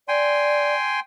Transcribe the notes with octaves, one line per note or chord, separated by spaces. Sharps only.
D5 G5 G#5 C6